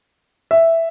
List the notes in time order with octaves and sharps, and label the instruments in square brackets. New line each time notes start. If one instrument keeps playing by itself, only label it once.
[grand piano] E5